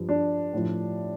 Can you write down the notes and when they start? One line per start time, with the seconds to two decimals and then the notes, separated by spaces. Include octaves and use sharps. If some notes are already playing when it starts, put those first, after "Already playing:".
Already playing: G2 F3
0.09 D4
0.53 A2 F3